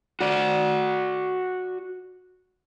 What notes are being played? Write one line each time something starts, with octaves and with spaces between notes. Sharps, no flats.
F#4 D5